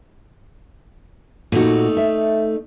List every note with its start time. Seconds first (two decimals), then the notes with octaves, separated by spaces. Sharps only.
1.52 A#2 A3 D#4 F#4
1.97 E5